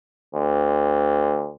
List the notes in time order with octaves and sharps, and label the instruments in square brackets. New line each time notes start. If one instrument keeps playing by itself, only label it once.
[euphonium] D2